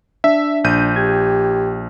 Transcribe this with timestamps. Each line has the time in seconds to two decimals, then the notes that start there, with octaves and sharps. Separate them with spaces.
0.24 D4 E5 B6
0.64 A#1 G6 D#7
0.96 G4 G#6